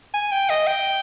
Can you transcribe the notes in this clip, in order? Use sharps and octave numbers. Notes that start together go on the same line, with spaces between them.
G#5
G5
D#5
G5